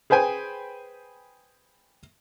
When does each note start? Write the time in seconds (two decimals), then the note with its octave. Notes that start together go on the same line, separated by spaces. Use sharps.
0.10 G#4 B4 C5 G5 G#5